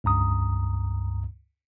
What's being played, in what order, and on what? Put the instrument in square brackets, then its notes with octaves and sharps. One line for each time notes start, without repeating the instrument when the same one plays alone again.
[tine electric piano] C#2 G2 A#5 D#6